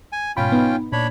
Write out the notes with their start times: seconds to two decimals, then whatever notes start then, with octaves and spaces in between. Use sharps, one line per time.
0.12 G#5
0.37 G#2 B2 C#4 F4 G5 B5
0.52 B3 D#4
0.92 A#2 D4 C#5 B5